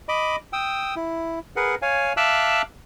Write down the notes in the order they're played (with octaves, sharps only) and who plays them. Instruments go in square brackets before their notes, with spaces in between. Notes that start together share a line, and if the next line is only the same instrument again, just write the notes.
[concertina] D#5 B5 D6
G5 D#6 E6
E4
G#4 A#4 B4 F#5
C#5 F5 G#5
E5 F5 A5 D6 E6 F#6